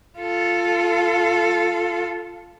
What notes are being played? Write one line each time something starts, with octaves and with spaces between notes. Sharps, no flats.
F4 A4